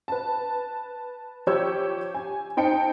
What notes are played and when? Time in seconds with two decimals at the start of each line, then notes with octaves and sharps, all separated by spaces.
0.08 B4 A5
1.47 F3 G4 C#5 E6 G6
2.15 G#5
2.57 C4 D#4 G5 A5 C#7